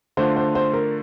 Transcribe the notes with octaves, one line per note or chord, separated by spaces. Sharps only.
D3 A3 D4 F4 C5
C5
C5
A#4